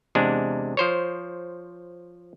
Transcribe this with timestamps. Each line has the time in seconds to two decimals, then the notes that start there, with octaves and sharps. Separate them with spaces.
0.15 E2 C3 G#3 D4
0.77 F3 C5 C#5